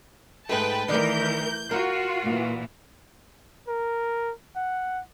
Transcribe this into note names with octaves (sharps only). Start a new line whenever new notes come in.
G#2 G#3 A3 B4 G5 A5
D#3 E3 A3 A#4 D5 G6
F4 F#4 A#4
A#2 E3
A#4
F#5